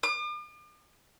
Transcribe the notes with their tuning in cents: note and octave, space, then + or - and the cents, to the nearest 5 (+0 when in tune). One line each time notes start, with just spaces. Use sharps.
D6 +45